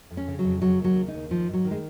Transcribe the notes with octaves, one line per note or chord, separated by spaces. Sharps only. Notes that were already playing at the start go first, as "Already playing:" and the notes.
F2
C#4
C#3
F#3
F2
C#3 F#3
D#2 F#3
C#3
D#4
D#2
D#3 F3
G#2
F#3
D#3
G#3